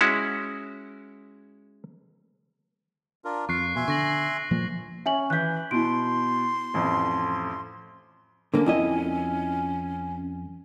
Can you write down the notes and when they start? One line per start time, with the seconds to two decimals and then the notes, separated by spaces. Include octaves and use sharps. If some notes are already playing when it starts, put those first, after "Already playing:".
0.01 G#3 C#4 E4 F#4
3.25 D4 F4 A#4
3.49 F2 F4 C#6 F#6 C7
3.76 B2 E5 G#5 C6
3.88 D3 C#6 A#6 F#7
4.51 A#2 F3 A#3
5.06 C#4 E5 G#5 F#7
5.30 E3 F#6 G6 B6
5.71 B2 E4 C6 D7
6.74 A1 F2
8.54 D3 A#3 C#4
8.66 F2 E4 D#5